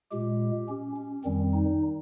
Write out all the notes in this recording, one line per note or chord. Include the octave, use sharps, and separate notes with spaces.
A#2 G#3 G4
C#4
C#4
F2 D#3 G3 C4
D#4